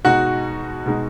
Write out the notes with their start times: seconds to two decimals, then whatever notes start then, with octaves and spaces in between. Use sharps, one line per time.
0.05 B2 G#3 D#4 F#4 F#5
0.86 B2 G#3 D#4